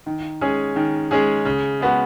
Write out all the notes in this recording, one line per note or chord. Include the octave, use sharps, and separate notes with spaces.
D#3
G#3 C#4 G#4
D#3
G#3 C#4 G#4
C#3
G#3 B3 F#4